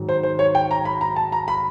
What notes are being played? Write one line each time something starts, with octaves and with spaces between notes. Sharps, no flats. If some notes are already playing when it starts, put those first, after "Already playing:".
Already playing: G#2 D#3 F#3
C5
C5
C#5
G5
A#5
B5
A#5
A5
A#5
B5